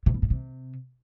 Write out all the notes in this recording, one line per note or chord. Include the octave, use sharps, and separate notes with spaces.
C3
B2
A2
C3